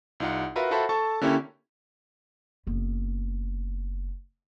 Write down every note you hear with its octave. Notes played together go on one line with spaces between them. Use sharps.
C2 D#4 F4 F#5
F4 F#4 A#4 B4 E5
F4 F#4 A4 C5 E5 B5
A4 A5 C#6
D3 A#3 C#4 E4 G4 C#5
F#1 B3